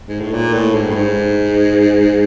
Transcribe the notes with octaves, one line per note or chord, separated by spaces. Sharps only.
G#2
A2
A#2
A2
G#2
G2
G#2